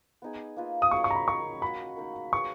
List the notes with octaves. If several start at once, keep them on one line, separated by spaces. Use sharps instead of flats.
B3 D#4 G#4
A#3 F4 B4 D#5
D#6
F#3 C#4 G#4 D#5 C#6
C#6
A#5
B5
D#4 A#4 C#5 F5 C#6
G#3 C#4 F#4 B5
A#3 D#4 A#4
C#4 G#4 B4 C#6